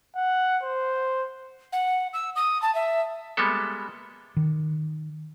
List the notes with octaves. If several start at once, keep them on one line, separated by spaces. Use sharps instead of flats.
F#5
C5
F#5
E6
D#6
A5
E5
G3 G#3 A#3 B3 A4
D#3